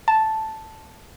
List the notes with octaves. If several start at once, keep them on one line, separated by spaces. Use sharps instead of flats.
A5